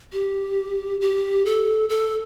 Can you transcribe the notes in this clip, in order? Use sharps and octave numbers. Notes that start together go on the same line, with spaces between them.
G4
G4
A4
A4